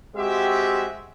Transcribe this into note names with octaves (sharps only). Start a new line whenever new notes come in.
G#3 C4 F#4 G4 E5